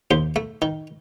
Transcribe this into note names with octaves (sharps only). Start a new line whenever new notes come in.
D#2 C5
A3
D#3